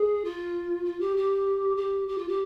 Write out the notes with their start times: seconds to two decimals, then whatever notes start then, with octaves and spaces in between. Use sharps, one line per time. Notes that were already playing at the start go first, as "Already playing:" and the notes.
Already playing: G#4
0.24 F4
0.85 F4
1.00 G4
1.17 G4
1.77 G4
2.08 G4
2.18 F4
2.28 G4